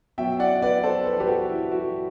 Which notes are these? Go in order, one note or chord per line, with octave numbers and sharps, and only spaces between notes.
B2 F#3 E5 G5
D5 F#5
B4 D5
A4 C5
B4
A4
G4 B4
F#4 A4
E4
F#4